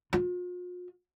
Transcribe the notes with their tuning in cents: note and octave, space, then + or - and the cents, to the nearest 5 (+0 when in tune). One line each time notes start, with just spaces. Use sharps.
F4 +45